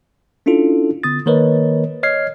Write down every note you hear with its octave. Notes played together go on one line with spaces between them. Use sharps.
C#4 D4 E4 F4 A4
D3 B3 D#6 A6
D#3 A#3 A#4 B4 C#5 D#5
C#5 D#5 F6 G#6 C7